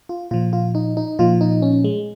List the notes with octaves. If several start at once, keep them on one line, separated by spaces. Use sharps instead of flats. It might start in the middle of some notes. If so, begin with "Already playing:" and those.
F4
A#2 F3 F4
F4
D#4
D#4
A#2 F3 F4
D#4
C#4
G#3